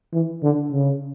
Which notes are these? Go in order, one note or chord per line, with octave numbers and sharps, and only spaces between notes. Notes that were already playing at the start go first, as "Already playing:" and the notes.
E3
D3
C#3